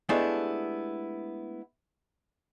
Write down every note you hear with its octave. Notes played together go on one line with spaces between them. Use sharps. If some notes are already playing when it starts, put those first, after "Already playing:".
G#3 A3 B3 D4 E4 G4